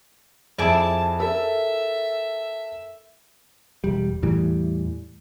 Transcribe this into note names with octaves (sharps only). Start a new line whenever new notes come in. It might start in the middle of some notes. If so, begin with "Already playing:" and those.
F2 E4 G#4 D5 A5
A4 A#4 E5
E1 G3
E2 A2 E3 G3